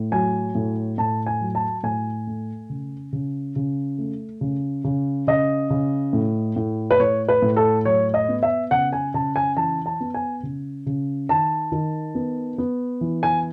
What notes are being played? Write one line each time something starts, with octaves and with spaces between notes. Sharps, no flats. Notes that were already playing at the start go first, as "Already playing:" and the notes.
Already playing: A2
F#3 G#5
A2
A2 A5
G#5
F#3
A5
A2 G#5
A3
C#3
C#3
C#3
A3
C#3
C#3
C#3 D#5
C#3
A2
A2
B4
A2 C#5
B4
A2
A4
F#3 C#5
D#5
B3
E5
C#3 F#5
G#5
C#3 A5
G#5
E3 A5
A5
B3
G#5
C#3
C#3
D#3 A5
D#3
B3
B3
E3
G#5